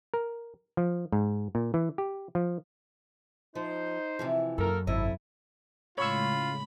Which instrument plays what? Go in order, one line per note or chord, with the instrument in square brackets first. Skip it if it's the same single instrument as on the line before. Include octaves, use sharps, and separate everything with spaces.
[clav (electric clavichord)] A#4
F3
G#2
A#2
E3
G4
F3
[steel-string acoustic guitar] F3 [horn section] D#4 C5
[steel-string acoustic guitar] C3 E3 F3
[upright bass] F#2 [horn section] A#3 A4 A#4
[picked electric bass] G#1 [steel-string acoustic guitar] C3 D#5 [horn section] E4 A4
[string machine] A2 C#3 G#3 [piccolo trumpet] F4 [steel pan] C#5 C#6 E6 [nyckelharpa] B5